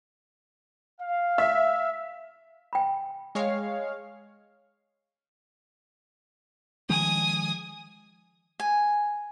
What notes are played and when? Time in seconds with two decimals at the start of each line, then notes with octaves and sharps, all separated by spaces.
1.01 F5
1.38 E5
2.73 G5 B5
3.35 G#3 C#5 F5
6.89 D#3 F3 G#3 G#5 D#6
8.60 G#5